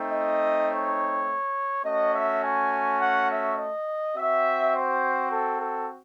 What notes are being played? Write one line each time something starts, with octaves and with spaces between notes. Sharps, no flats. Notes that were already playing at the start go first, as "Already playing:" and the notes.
Already playing: A3 C4 D#4
D#5
C#5
A3 C#4 F#4 D#5
E5
G#5
F#5
E5
D#5
C4 F#4 E5
C5
A4
A4